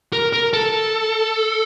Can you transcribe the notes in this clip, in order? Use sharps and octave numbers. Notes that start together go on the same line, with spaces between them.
A#4
A#4
A4